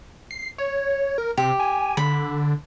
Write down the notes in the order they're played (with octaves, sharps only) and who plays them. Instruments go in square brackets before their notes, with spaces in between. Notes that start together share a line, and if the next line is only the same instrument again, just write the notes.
[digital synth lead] C7
C#5
A#4
[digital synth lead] C3 [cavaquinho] G4
[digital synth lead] G#5
[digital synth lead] D3 [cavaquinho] B5